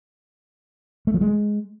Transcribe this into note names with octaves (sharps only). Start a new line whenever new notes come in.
A3
F3
G#3